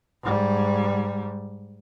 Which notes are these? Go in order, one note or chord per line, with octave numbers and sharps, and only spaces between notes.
G#2 G3